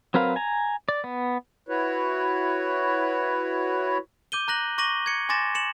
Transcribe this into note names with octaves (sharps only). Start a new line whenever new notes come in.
F#3 C4 A#4 B4 F5
G#5 A#5
D5
B3
E4 F#4 B4 C#5
D6 G6 D#7 G7
A#5 F#6 A#6 F#7
C#6 D6 A#6 D#7 F#7 G7
G#6 C#7
G#5 C6 D6 A6 A#6 E7
C#7 E7 F#7